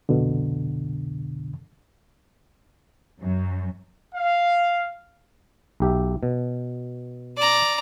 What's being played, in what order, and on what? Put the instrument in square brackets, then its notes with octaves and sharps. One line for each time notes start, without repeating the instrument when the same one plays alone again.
[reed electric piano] C2 F2 B2 D3
[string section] F#2
[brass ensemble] F5
[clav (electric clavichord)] B1 G4 E5
B2
[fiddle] D5 A#5